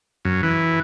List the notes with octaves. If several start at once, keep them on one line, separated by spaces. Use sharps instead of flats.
F#2
E3